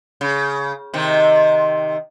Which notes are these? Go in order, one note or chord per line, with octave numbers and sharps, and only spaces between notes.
C#3
C3 D#3